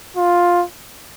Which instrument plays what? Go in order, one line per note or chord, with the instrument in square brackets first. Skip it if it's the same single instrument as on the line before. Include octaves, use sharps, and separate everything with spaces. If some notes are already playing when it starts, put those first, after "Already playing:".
[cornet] F4